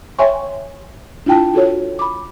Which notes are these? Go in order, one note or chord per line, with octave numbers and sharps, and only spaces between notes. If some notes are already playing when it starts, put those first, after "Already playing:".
C#5 E5 G5 G#5 C6 C#6
D4 E4 F4 G5 A5
F4 F#4 A4 C#5
B5 D6